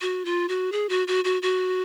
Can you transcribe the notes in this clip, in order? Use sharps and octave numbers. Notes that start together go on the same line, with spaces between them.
F#4
F4
F#4
G#4
F#4
F#4
F#4
F#4